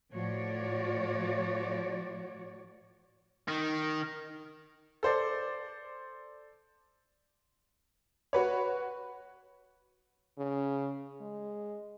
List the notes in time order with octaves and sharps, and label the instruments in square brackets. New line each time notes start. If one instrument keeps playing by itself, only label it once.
[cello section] A2 F3 F#4 C#5 D5
[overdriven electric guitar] D#3
[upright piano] A4 C5 D5
[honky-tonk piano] F#4 B4 C#5
[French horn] C#3
G#3